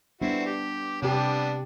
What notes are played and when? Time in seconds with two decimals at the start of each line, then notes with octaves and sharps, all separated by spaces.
0.21 G3 B3 C4 D4 E4 F#4
0.46 G4
1.02 C3 G3 B3 D4 G4